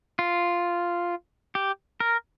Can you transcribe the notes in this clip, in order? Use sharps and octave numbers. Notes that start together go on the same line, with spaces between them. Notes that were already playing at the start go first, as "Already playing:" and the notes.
F4
G4
A#4